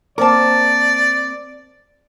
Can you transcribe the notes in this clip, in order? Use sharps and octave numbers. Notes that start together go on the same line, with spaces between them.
A#3 C4 A#4 D5 A5 D6